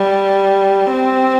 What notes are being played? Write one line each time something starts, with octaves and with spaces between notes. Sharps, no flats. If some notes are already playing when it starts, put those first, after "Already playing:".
Already playing: G3
C4